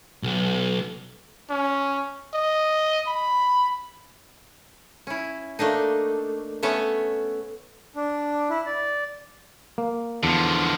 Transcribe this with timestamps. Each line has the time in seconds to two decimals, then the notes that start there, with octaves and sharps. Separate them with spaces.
0.23 B1
1.50 C#4
2.34 D#5
3.07 B5
5.07 C#4 E4
5.59 A3 A#3 D4 D#4
6.63 A3 B3 C#4 C#5 E5
7.96 D4
8.50 E4
8.66 D5
9.78 A#3
10.23 E2 D3 F3